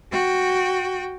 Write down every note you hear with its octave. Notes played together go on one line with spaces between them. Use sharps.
F#4 G5